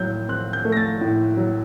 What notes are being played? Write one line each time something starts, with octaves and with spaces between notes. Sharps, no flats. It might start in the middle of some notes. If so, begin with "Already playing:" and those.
Already playing: A2 F#3 G6
C4 F#6
G6
A3
A#6
A6
A2
F#3